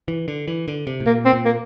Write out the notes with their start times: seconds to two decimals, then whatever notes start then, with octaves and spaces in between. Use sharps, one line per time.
0.08 E3
0.28 D3
0.48 E3
0.68 D3
0.87 C3
1.00 A2
1.06 A#2 A#3
1.25 C4
1.33 A#2
1.45 A#3